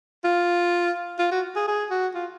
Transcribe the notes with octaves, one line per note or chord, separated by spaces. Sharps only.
F4
F4
F#4
G#4
G#4
F#4
F4